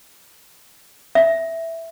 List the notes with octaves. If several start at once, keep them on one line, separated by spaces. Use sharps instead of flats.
E5